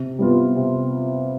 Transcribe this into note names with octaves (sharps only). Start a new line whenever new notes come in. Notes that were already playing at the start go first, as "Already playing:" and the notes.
Already playing: C3
G3 B3 F4
C3